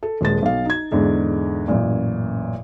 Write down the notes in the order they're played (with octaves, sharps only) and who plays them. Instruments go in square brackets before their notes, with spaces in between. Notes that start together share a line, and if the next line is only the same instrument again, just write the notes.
[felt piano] A4
D#1 G#3 A6
B1 F5
D#4 G#6
E2 G#2 D3
A1 F#2 A#2